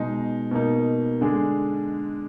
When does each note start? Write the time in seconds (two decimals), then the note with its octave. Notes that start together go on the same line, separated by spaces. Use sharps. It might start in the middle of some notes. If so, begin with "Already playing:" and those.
Already playing: B2 G#3 D#4
0.51 B2 A#3 D#4
1.21 D3 G#3 D4 G#4